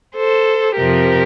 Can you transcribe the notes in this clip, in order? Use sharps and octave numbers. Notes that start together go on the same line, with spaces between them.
A4 C5
F2 C3 F3 G4 A#4